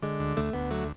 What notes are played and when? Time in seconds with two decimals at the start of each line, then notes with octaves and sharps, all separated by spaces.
0.02 D3 G#3
0.20 D2
0.37 D2 A3
0.53 D2 B3
0.71 F#3 A3